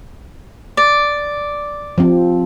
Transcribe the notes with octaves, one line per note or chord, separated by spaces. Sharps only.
D5
F3 C4